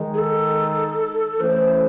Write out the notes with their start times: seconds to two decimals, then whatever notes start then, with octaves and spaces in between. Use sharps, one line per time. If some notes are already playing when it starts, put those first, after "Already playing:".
Already playing: D#3 G#3 D#4
0.14 G#4
0.18 A4
1.40 E3 A3 C#4 E4 C5